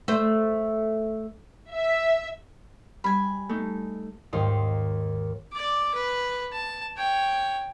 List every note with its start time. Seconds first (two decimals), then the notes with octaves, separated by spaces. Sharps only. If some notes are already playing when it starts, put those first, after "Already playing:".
0.08 A3 C5
1.71 E5
3.04 G3 G#5 B5
3.49 A3 D#4
4.33 D#2 G#2 D#4 C6
5.53 D5 D6
5.94 B4
6.52 A5
6.96 C#5 G5